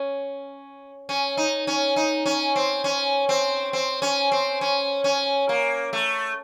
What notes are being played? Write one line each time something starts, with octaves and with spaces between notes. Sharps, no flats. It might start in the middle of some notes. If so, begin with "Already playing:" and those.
Already playing: C#4
C#4
D#4
C#4
D#4
C#4
C4
C#4
C4
C4
C#4
C4
C#4
C#4
A#3
A3